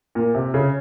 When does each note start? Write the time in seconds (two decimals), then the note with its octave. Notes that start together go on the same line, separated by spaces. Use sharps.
0.15 A#2
0.35 C3
0.54 C#3